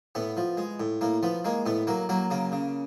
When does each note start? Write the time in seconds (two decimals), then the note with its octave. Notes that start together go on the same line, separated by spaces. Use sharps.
0.15 A2 B3
0.37 F3
0.57 G#3
0.80 A2
1.01 A2 A#3
1.23 F3 B3
1.44 G#3 A#3
1.66 A2 B3
1.87 F#3 A#3
2.09 F#3 A#3
2.31 C#3 A#3
2.52 C#3